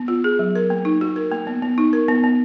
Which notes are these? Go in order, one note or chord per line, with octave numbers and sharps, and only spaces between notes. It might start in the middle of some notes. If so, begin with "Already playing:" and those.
Already playing: B3
F4
G#4
F#3
A#4
A#3
D#4
F#4
A#4
A#3
B3
B3
D#4
A#4
B3
B3